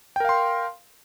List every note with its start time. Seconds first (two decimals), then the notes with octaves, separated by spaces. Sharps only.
0.16 G5
0.20 A#4
0.25 F5
0.29 C6